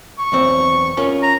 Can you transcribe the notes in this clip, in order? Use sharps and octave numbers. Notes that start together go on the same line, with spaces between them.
C#6
B1 E2 C4
C#4 F4 A#4
A#5